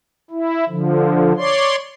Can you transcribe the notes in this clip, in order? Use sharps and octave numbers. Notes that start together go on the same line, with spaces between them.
E4
D3 F3
C#5 D5 C6